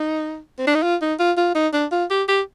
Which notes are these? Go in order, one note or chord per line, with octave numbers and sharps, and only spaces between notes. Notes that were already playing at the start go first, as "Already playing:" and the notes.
Already playing: D#4
C4
D4
D#4
F4
D#4
F4
F4
D#4
D4
F4
G4
G4